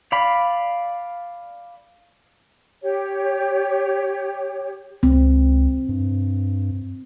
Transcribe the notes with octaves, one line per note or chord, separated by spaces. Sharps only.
D5 F5 B5
G4 C#5
C#2 C4
G2